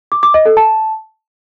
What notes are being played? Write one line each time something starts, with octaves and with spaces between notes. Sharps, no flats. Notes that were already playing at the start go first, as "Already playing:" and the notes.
D6
D6
D#5
A4
A5